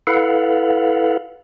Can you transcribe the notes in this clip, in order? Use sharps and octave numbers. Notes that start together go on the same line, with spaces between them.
E4 A4 B4 F5 F#5